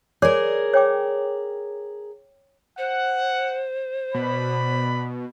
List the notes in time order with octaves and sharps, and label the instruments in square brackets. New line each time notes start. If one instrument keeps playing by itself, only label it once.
[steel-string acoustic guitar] G#4 A#4 [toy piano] C#5 D5 D6
[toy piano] C#5 G5 D6
[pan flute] C5 [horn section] F#5
[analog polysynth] B2 [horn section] B4 D5 B5